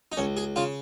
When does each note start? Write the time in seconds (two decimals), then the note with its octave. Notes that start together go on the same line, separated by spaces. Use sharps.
0.12 D#4
0.17 C#2 C#4
0.37 G#4
0.56 C#3 F4